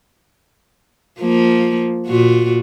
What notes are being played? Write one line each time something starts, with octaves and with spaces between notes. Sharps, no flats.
F3 A#3
A#2 F4 F#4